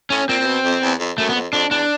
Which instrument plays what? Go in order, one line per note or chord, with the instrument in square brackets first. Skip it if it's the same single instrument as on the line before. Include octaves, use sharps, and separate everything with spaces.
[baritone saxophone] A2 [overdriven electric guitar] C#4
[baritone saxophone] A#2 [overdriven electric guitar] C4
[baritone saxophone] A#2
B2
F2
E2
F2
[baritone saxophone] F#2 [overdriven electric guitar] A3
[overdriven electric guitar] B3
[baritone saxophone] F2
[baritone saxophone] F2 [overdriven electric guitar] D4
[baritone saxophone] E2 [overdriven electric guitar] D4